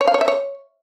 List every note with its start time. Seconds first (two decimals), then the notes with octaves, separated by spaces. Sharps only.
0.01 C#5
0.07 F5
0.14 C#5
0.21 E5
0.28 C#5